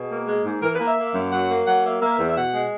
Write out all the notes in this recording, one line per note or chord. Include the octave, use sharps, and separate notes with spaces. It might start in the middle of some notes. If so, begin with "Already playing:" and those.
Already playing: B2 G#4
A#3
G#3
G#2
E3 A#4
B4
A#3 E5
A#3
F#2
F#3 F#5
A#3
F#3 F#5
A#3 E5
A#3 E5
E2
E5
B2 F#5
G#3